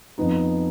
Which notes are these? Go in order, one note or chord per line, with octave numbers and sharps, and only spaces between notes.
F2 F3 B3 D#4